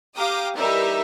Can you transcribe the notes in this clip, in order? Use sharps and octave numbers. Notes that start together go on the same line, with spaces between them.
G4 F5 G5 A#5 D6 D#6
E3 G3 D#4 G4 A#4 E5